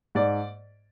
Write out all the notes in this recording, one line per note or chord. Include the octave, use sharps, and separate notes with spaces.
G#2 D5